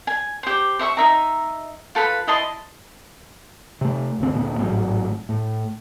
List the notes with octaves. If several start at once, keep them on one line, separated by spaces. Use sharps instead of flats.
G#5
G4 C5
C5 E5 B5 C#6
D#4 E5 A#5
F4 A4 B4 B5
E4 D#5 A5 C6
C3 A3
G1 D2 C4
D2 A#2 B3
G#1 A2 F#3
A2